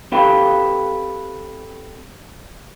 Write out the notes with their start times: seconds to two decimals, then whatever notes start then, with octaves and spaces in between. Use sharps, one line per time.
0.12 C4 G4 A4 B4 F5 G5